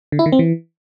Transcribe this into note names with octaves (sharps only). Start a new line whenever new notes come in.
D3
E4
D#3
C4
E3